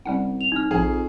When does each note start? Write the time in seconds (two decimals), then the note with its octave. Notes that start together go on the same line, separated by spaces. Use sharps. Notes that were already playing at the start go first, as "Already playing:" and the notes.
0.05 C2 G3 C#4 F#5
0.41 F7
0.52 C2 D#4 F6
0.71 A#1 F2 F3 G#4